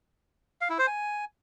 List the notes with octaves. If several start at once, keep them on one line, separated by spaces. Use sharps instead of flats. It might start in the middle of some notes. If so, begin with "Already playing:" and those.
F5
E4
C5
G#5